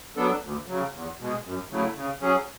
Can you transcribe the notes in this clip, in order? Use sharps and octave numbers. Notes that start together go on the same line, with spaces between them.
F#3 B3 D4 A4
D2
C#3 F#3
E2
B2 G#3
F#2
C#3 F#3 A3 E4
C#3
F#3 C#4 G#4